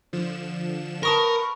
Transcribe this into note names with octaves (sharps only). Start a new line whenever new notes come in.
D3 F3 E7
A#4 B4 A5 C#6 D#6 A#6